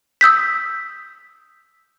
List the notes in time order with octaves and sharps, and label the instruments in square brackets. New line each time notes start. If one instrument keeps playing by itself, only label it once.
[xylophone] D#6 E6 G6 B6